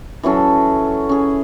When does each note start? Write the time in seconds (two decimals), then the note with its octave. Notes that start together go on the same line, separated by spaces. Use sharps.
0.23 E3 F#3 C#4 A4
1.09 C#4 G#4